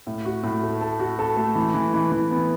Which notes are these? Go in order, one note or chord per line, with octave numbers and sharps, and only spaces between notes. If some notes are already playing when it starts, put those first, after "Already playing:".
A2
F#4
A2
A3
A4
F#4
A4
A3
E3
E3
E3
E3
B3